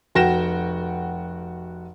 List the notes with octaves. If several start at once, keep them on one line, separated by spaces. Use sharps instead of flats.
F1 F#4 G5 A#6 E7